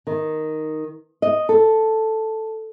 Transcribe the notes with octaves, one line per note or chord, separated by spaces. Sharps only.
D#3
D#5
A4